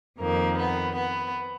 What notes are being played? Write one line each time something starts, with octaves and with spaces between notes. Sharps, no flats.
F2 D#3 A#3
B3
B3